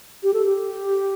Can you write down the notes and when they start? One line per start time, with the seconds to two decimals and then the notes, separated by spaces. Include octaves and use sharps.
0.23 G4
0.34 A4
0.46 G4